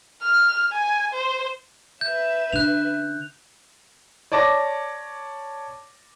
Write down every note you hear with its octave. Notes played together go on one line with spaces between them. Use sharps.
F6
G#5
C5
B4 E5 G6
D3 C#4 F#6 F7
C#5 D5 A5 D6 A#6